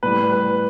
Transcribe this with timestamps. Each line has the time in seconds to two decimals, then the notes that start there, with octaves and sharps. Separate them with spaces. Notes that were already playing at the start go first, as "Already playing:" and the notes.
0.03 A2 G3 B4
0.32 B4